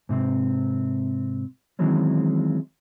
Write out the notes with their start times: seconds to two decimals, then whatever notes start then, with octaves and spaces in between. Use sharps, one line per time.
0.09 G#2 C3 C4
1.79 D#3 E3 F#3 G#3 C4 C#4